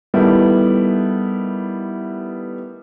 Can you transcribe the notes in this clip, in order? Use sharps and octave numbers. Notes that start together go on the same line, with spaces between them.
D#3 G3 A3 B3 E4